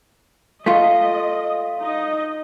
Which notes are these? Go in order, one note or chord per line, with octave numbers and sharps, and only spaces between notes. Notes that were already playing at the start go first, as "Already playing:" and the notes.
A3 F4 D#5
D#4 D#5